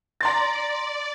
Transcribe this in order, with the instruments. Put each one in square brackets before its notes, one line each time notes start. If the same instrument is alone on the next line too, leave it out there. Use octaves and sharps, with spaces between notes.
[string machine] D5 [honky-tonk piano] A#5 C6 A6